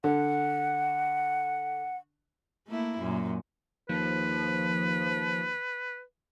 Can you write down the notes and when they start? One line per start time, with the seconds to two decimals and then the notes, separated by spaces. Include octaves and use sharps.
0.04 D3 F#5
2.68 A3 A#3 E4
2.99 F#2 A#2
3.89 D#2 F3 B4